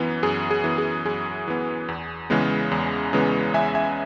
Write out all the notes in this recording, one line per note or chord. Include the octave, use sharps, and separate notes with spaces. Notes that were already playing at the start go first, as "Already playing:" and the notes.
Already playing: F#2 E3 B3
F#2 G#4
G#4
E3 B3
G#4
F#2 G#4
E3 B3
E2
C#3 E3 G#3 B3
E2
C#3 E3 G#3 B3
E2 E5 G#5
E5 G#5